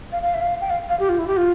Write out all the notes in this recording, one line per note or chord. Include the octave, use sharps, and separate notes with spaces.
F5
F5
E5
F5
G5
F5
F5
G4
F4
E4
G4
F4